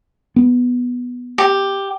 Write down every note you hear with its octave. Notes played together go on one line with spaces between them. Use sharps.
B3
G4